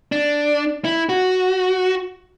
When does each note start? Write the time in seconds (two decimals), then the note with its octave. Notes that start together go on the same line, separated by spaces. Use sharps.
0.12 D4
0.85 E4
1.09 F#4